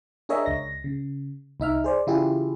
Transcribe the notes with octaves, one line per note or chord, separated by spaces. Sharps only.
D4 G#4 A#4 C#5 D#5 E5
C#2 A#6
C#3
C2 D#4 E5 F6
G#4 C5 D5
C#3 E3 E4 F4 G4 G#4